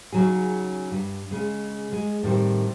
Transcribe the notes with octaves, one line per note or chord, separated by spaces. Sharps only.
C#3 F#3 D#4 G#4
G2
C#3 G#3
G#3
A2 D#3 G3 C4